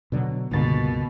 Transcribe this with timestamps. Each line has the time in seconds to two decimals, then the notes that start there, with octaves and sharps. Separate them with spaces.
0.12 B2 D3 F#3
0.52 C#2 G2 B2 D3 A#3 A6